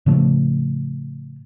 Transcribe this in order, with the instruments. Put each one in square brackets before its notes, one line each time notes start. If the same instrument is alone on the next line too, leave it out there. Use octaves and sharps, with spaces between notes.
[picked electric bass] A2 C#3 F3 A3